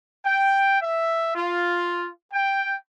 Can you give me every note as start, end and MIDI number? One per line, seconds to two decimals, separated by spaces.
0.26 0.80 79
0.82 1.35 76
1.36 2.10 65
2.34 2.77 79